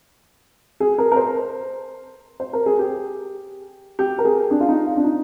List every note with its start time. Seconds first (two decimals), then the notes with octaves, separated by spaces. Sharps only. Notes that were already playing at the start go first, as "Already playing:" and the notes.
0.80 G#4
0.98 A#4
1.12 A#4
1.16 C5
2.40 C5
2.53 A#4
2.66 G#4
2.79 G4
3.99 G4
4.19 A#4
4.25 G#4
4.51 D4
4.61 F4
4.69 D#4
4.86 F4
4.97 D4
5.04 D#4